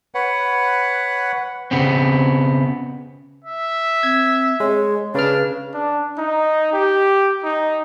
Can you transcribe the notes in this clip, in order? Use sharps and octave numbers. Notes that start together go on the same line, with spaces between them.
B4 C#5 F#5
C#3 B3 C4
E5
C4 G#6
G#3 C#5
C#3 D4 B4 F6
D4
D#4
G4
D#4